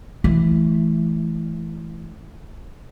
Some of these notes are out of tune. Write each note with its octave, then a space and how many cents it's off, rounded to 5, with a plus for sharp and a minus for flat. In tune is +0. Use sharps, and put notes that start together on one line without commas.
E3 +0 A3 -25